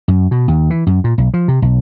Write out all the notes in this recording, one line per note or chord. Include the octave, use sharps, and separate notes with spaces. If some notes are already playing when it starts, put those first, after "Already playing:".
F#2
B2
D#2
E3
F#2
A#2
B1
F3
C3
B1